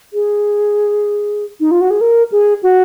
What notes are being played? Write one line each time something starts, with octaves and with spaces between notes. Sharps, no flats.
G#4
D#4
F4
F#4
G#4
A#4
G#4
F#4